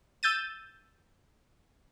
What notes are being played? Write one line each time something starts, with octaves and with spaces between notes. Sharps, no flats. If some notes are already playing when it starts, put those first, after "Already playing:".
E6 G6 A6 D#7